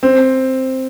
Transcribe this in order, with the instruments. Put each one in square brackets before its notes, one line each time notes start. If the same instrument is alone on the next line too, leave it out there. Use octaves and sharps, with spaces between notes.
[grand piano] C4